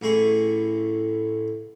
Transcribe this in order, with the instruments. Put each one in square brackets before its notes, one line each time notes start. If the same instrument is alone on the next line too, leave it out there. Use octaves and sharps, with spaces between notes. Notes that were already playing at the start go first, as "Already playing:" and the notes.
[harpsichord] A1 A2 G#4 C#6